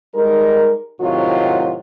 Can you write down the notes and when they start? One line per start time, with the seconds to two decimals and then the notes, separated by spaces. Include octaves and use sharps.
0.15 G3 G#3 D#4 A#4
1.00 A2 C3 D#3 F#3 F4 F#4